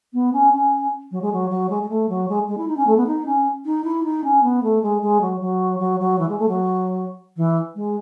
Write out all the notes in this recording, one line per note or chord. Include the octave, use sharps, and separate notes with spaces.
B3
C#4
C#4
F#3
G#3
F#3
F#3
G#3
G#3
A3
F#3
G#3
G#3
E4
D#4
C#4
A3
B3
D#4
C#4
D#4
E4
D#4
C#4
B3
A3
G#3
G#3
F#3
F#3
F#3
F#3
E3
G#3
A3
F#3
E3
G#3